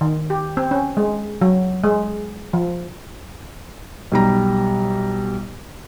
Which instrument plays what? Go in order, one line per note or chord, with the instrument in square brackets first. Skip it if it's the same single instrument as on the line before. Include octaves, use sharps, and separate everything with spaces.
[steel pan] D#3
G4
C4
C#4
G#3
F#3
G#3
F3
[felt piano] B1 G3 A#5